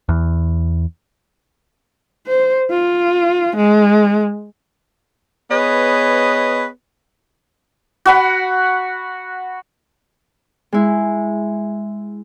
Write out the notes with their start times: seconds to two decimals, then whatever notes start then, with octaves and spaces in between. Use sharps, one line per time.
0.09 E2
2.27 C5
2.70 F4
3.56 G#3
5.50 B3 G#4 B4 C#5 D#5
8.05 F#4 F#5 B5
10.72 G#3 E4